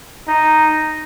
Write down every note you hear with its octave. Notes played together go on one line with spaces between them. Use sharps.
D#4